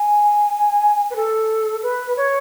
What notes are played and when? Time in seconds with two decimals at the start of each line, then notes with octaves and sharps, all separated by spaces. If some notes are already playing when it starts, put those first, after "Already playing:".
Already playing: G#5
1.10 B4
1.16 A4
1.83 B4
2.17 C#5